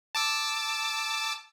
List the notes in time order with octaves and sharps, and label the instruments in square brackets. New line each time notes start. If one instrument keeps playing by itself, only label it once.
[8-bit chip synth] A5 D6 E6